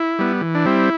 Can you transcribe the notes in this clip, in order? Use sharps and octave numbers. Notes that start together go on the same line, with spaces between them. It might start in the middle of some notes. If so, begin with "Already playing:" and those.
Already playing: E4
G3 B3
E3
D4
G3 C4 E4